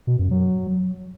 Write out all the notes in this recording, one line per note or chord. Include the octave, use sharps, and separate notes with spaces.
B2
F#2
F#3